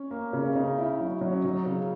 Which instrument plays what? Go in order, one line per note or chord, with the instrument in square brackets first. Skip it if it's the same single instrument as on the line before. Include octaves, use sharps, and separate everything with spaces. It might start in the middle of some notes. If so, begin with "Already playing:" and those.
Already playing: [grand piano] C#4
[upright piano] A#3
C#3
[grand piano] C#4
[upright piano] C#3 [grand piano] D#4
[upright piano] E4
F#3
F#3
[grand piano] C#4
[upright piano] F#3 [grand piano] D#4
[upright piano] C#3